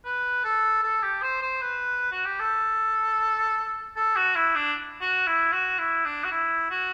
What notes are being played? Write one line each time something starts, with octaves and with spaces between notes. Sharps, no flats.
B4
A4
A4
G4
C5
C5
B4
F#4
G4
A4
A4
F#4
E4
D4
F#4
E4
F#4
E4
D4
F#4
E4
F#4